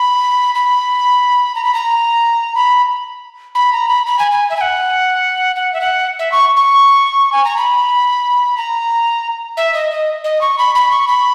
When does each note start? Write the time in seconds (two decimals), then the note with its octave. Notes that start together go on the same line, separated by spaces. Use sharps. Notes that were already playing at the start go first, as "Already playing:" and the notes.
Already playing: B5
0.55 B5
1.55 A#5
1.64 B5
1.75 A#5
2.55 B5
3.55 B5
3.73 A#5
3.89 B5
4.06 B5
4.19 G#5
4.31 G#5
4.50 E5
4.57 G#5
4.61 F#5
5.56 F#5
5.73 E5
5.81 F#5
6.19 E5
6.32 C#6
6.57 C#6
7.33 G#5
7.45 A#5
7.57 B5
8.58 A#5
9.57 E5
9.74 D#5
9.91 D#5
10.24 D#5
10.41 C#6
10.58 B5
10.75 B5
10.91 C#6
11.08 B5